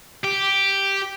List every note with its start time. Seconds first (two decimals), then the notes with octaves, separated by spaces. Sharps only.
0.24 G4